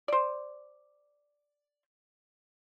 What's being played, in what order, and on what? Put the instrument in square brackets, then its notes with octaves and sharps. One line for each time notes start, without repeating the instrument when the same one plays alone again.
[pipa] C5 D5